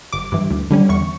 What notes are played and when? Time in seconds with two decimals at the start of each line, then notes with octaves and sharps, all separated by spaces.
0.13 G1 D6
0.32 G2 E3
0.50 D2
0.71 D3 G3 C#4
0.89 E2 C#6